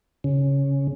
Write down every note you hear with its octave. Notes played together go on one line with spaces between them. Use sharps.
C#3